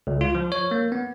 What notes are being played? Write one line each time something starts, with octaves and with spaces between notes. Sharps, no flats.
C#2
F4
F3
C#5
A#3
B3